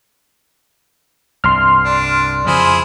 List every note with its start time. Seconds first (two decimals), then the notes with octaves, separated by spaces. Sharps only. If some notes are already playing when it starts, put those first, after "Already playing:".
1.44 C2 G2 C6 F6
1.84 D4
2.47 F2 C#3 F3 E4 G#4 C5